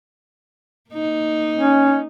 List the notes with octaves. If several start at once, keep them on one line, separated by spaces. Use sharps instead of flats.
A#3 D#4
C#4